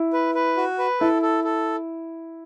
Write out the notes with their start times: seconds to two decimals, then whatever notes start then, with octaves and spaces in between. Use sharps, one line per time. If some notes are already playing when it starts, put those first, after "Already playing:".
Already playing: E4
0.13 B4
0.35 B4
0.57 F#4
0.79 B4
1.00 E4 A4
1.22 A4
1.44 A4